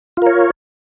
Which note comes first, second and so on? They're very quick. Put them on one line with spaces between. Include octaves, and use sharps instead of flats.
F4 A#4 C#5